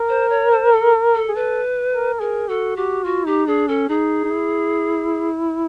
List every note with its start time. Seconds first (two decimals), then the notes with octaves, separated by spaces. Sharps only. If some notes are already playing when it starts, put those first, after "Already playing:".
Already playing: A#4
0.09 C5
0.30 C#5
0.51 C5
0.72 A4
1.15 A4
1.29 G#4
1.35 A4 B4
1.92 A#4
2.20 G#4 A#4
2.49 F#4 A4
2.77 F#4 G4
3.04 F4 F#4
3.26 D#4 G4
3.47 D4 G#4
3.68 C#4 A4
3.89 D#4 G#4
4.24 D#4
4.31 E4